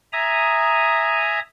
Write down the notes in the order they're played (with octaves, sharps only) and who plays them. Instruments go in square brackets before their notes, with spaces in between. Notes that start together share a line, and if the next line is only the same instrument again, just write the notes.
[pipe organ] E5 G#5 A#5 D#6